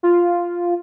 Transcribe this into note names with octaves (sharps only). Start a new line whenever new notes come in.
F4